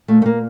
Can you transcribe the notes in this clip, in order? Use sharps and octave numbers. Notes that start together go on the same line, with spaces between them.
A#2 A3
A3
A#3